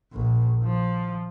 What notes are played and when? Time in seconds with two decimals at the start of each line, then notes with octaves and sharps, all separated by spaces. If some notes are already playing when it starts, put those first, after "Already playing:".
0.13 A#1
0.64 F3